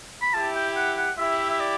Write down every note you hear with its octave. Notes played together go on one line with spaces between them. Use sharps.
B5
E4 G4 A5
G5
F#5
F#5
E4 G4 E5
E5
D5